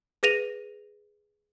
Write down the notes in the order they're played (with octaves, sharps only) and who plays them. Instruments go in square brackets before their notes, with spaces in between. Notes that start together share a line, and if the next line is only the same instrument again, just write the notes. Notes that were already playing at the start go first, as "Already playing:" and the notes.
[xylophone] G#4 B4 A#6 D#7 F7